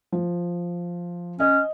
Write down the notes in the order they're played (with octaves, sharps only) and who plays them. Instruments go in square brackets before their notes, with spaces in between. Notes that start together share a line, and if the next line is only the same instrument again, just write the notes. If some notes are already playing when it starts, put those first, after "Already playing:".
[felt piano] F3
[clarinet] C#4 [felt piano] D#5